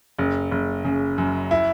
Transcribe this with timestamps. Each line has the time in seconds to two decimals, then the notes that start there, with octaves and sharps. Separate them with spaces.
0.18 F#1
0.51 F#1
0.84 C#3
1.18 F#2
1.51 E4